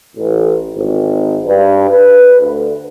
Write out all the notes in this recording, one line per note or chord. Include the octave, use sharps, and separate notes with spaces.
A1
G#1
G2
B4
D2